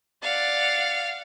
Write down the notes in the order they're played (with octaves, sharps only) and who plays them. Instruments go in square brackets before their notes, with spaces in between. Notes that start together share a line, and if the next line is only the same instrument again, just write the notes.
[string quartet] D5 A6 [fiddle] F5 F#5